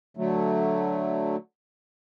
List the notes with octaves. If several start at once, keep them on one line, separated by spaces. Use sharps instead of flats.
D3 F#3 A3